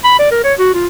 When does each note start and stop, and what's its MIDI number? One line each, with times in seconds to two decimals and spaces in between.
0.04 0.18 83
0.19 0.31 74
0.32 0.43 70
0.44 0.53 73
0.59 0.73 66
0.75 0.87 65